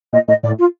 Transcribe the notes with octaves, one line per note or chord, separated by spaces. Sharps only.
A#2 D#5
A2 D#5
A2 D5
F4